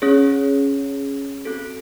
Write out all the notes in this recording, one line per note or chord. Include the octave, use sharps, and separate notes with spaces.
C#4 G#4 C#5
C4 F#4 A4